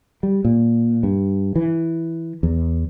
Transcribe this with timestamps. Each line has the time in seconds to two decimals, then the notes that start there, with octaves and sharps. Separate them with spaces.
0.23 G3
0.45 A#2
1.03 G2
1.56 E3
2.43 E2